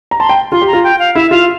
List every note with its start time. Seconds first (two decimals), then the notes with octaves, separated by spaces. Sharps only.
0.11 A#5
0.19 A5 C6
0.29 G5
0.52 F4 C6
0.61 G4
0.67 A#5
0.73 F4
0.84 G5
0.99 F5
1.15 E4 E5
1.31 F4 F5